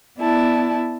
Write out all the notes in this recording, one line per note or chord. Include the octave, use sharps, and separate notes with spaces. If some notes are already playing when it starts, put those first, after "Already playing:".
B3 E4 D5 A5